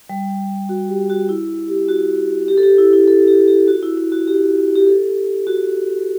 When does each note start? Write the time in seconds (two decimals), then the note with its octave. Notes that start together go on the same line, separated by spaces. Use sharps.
0.10 G3
0.69 F#4
0.89 G4
1.10 F#4
1.29 E4
1.68 G4
1.88 F#4
2.48 G4
2.58 A4
2.63 G4
2.78 E4
2.93 E4
3.08 A4
3.28 G4
3.48 G4
3.68 F#4
3.83 E4
3.97 E4
4.12 F#4
4.28 G4
4.75 G4
4.87 A4
5.47 F#4